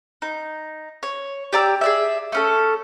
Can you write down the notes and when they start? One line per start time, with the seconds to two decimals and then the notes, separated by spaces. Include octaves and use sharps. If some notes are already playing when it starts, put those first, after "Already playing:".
0.22 D#4
1.03 C#5
1.53 G4 D5 A#5 E6
1.81 G#4 D5 E5
2.32 A3 C#4 A4